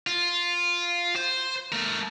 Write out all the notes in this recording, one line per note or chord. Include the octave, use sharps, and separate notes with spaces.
F4
C5
A3 A#4